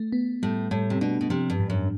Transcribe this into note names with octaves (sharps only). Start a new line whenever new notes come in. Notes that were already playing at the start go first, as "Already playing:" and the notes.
Already playing: A3
B3
A2 G3
A2 G3
C3
B2 D4
B2
C3 F3
G2
G#2
F#2